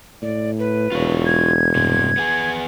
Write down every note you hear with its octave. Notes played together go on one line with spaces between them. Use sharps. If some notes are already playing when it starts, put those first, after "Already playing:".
A2 D5
B4
E1 F4 C#5
G#6
G2 C3
B3 G#4